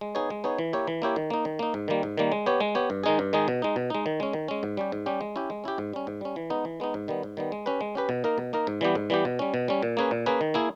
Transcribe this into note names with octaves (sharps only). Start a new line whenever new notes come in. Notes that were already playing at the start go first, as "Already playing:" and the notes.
G#3
B3 D#4 G#4 C#5
G#3
B3 D#4 G#4 C#5
E3
A#3 E4 G4 C#5
E3
A#3 E4 G4 C#5
D#3
A#3 D#4
D#3
A#3 D#4
G#2
D#3 G3 A#3
G#2
D#3 G3 A#3
G#3
B3 G4 C#5
G#3
B3 G4 C#5
G2
D#3 G#3 D#4 G#4
G2
D#3 G#3 D#4 G#4
B2
G#3 D#4
B2
G#3 D#4
D#3
G#3 C#4
D#3
G#3 C#4
G#2
G3 C#4 G4
G#2
G3 C#4 G4
G#3
C#4 E4 G4
G#3
C#4 E4 G4
G#2
G3 C#4
G#2
G3 C#4
E3
G#3 B3 D#4
E3
G#3 B3 D#4
G#2
D#3 G3 B3
G#2
D#3 G3 B3
G#3
C#4 G4 B4
G#3
C#4 G4 B4
B2
A#3 D#4 A#4
B2
A#3 D#4 A#4
G#2
E3 G3 B3 G4
G#2
E3 G3 B3 G4
B2
G3 C#4
B2
G3 C#4
A#2
A#3 C#4 G#4 B4
A#2
A#3 C#4 G#4 B4
D#3
A#3 E4 G#4